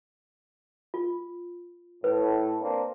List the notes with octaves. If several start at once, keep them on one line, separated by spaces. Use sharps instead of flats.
F4
A2 B4
A#3 C4 D4